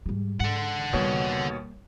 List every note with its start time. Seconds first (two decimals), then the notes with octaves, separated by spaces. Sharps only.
0.06 G#2 G3
0.40 G#2 A4 F#5
0.93 D#2 B2 G3 A#3 C#5